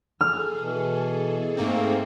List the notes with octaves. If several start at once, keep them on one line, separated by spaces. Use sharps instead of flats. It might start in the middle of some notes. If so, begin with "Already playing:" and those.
G#4 A4 F6
B2 E3
G#2 A3 A#3 C4